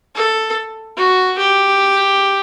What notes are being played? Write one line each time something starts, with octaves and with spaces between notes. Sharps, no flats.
A4
F#4
G4